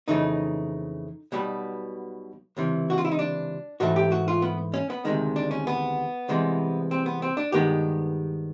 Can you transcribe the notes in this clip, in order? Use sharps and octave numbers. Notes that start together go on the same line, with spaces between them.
F2 C#3 E3 A3 D#4
B1 B2 G3 B3
C#2 C3 E3
F#4
F4
E4
D#4
D4
G#2 E3 A3 F#4
G4
F#4
F4
B3
C#4
B3
D2 C3 D#3 G#3
D4
C#4
B3
C2 C3 E3 G#3
C4
B3
C4
D4
G2 D#3 G#3 B3 G4